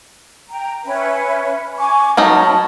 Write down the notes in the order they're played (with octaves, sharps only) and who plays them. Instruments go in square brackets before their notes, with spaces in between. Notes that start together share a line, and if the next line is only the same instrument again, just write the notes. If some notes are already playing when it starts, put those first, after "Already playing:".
[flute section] G5 A#5
C#4 B4 E5
G#5 C#6 D6
[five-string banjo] F#3 C#4 D#4 [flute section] A5 B5 C#6